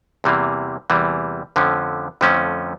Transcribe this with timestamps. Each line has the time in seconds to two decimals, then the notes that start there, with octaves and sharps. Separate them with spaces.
0.24 E2 C3 E3 G3 A#3
0.90 E2 C3 E3 G3 A#3
1.56 F2 D3 F3 A3 C#4
2.21 F2 D3 F3 A3 C#4